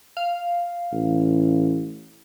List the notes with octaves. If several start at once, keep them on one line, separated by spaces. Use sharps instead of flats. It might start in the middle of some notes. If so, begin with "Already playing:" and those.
F5
A1